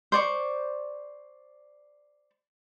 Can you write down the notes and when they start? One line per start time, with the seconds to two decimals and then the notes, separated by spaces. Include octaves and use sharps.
0.12 C5 D5 C#6